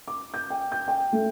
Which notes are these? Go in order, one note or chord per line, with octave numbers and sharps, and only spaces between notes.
D6
G6
G5
G6
G5
A3